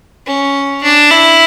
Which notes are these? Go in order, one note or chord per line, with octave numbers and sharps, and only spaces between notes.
C#4
D4
E4